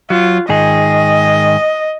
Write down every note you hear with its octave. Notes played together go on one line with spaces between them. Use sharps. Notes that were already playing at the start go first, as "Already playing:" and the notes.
F#3 F4
G#2 D#3 G#4 D#5